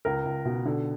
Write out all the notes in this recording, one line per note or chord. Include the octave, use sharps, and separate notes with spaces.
C#2 A#4
C#2
B2
D3